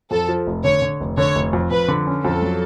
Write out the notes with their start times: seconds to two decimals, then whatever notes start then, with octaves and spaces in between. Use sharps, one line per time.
0.11 F2 A4
0.29 F3
0.47 F1
0.64 D3 C#5
0.82 D3
1.00 F1
1.17 D3 C#5
1.35 F1
1.53 F2
1.71 F2 B4
1.88 D3
2.07 C#4
2.25 F2 A4
2.42 F#3